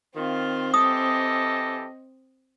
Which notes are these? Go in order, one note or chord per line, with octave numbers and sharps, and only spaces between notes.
D#3 C4 F4
E3 G4 A4 D#5 D#6